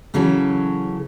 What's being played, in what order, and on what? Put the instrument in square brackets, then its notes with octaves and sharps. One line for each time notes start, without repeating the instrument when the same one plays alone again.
[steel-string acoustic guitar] C#3 E3 F#3 C#4 A4